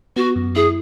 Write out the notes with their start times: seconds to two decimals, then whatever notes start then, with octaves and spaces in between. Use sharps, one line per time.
0.16 B3 F#4
0.36 F#2
0.55 E4 G#4